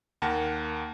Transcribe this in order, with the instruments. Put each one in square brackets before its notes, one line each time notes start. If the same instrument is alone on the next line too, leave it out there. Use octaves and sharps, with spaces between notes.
[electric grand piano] D#2 A#3 F#5 A5 A#6